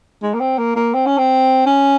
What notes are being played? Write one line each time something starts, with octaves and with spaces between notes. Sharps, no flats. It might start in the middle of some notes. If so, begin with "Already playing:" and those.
G#3
A#3
C4
A#3
A#3
C4
C#4
C4
C#4